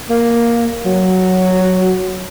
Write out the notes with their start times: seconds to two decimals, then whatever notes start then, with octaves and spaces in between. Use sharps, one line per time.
0.10 A#3
0.85 F#3